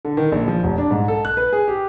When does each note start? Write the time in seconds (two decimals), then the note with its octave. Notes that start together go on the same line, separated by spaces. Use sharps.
0.05 D3
0.17 D#3
0.32 A#1
0.48 F3
0.64 F1
0.78 D4
0.91 G#2
1.08 A4
1.25 F#6
1.37 B4
1.53 G#4
1.68 G4